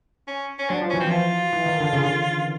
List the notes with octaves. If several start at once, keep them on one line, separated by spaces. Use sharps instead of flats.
C#4
C#4
F#3 D4
F3
E3 C#4
C4
F3 F4
E3
D#3
D3
C#3